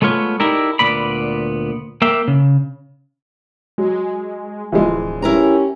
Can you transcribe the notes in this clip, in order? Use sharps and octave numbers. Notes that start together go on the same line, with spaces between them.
G#3 A3 B3 F4 C#5
D#4 E4 G4 A4 A#4 D5
D2 A#2 B3 D5 B5
A#3 E5 G5
C#3
F#3 G#3
D1 E3 F3 G#3
C#4 E4 G4 A#4 A#5